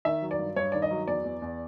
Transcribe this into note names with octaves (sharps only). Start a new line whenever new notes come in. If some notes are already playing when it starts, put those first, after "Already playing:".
D#3 E5
F#3
D5
G2
G2 C#5
D#3 D5
D#5
F#3
E2 D5
E2
E2